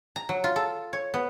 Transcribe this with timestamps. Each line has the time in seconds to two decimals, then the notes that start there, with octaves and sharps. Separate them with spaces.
0.16 A#5
0.29 F#3
0.44 F4
0.56 A4
0.93 C#5
1.14 B3